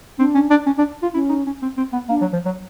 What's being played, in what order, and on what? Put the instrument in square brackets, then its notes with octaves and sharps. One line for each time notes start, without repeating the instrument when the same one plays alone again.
[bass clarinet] C4 [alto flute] D4
[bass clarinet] C#4
D4
C#4
D4
F4
[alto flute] C#4 [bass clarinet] E4
[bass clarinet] D#4
C#4
C4
C4
B3
[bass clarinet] A#3 [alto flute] D4
[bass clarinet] F#3
F3
F#3